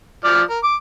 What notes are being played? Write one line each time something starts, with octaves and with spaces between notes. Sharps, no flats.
F3 D5 F6
A#4
D6